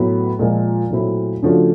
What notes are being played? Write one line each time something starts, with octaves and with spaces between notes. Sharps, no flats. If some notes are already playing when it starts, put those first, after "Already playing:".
Already playing: A2 F#3 B3
A#2 F3 G#3
A#2 F#3 A3 C4 E4
C#3 F3 A3 D4 F#4